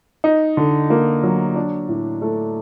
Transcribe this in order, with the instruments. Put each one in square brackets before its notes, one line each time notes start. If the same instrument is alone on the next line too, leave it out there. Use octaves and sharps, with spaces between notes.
[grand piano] D#4
D3
A#3
F#3
D4
A2
A3